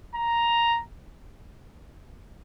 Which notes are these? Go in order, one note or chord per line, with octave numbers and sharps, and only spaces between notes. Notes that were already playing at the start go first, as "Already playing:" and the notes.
A#5